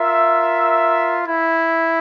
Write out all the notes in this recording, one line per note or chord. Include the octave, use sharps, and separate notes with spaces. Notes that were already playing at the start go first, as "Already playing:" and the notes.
Already playing: F4 A#4 E5
E4